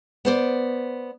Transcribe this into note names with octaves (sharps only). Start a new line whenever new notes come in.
B3 C5 D5